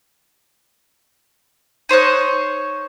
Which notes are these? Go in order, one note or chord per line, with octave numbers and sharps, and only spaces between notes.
D#4 C5 C#5 F#6